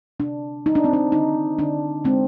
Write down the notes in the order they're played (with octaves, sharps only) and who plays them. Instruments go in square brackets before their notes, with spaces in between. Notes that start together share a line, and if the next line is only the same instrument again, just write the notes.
[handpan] C3 D4
G3 D#4
D4
C4
D4
D3 D#4
D3 D4
G#3 C4